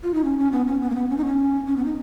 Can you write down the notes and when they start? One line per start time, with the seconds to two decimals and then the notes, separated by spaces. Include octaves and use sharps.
0.03 F4
0.14 D#4
0.24 C#4
0.38 C#4
0.52 B3
0.67 C#4
0.82 B3
0.90 A#3
0.95 B3
1.10 C#4
1.17 D#4
1.26 C#4
1.67 C#4
1.77 B3
1.85 D#4